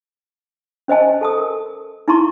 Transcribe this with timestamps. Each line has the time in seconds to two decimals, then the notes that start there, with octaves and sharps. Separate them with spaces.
0.88 C#4 C5 D#5 G#5 A5
1.21 A4 A5 D#6
1.39 A#4
2.08 D#4 E4 A5 A#5 C6 C#6